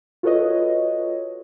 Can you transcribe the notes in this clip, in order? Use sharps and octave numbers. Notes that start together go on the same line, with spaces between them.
F4 F#4 A4 B4 C#5 D#5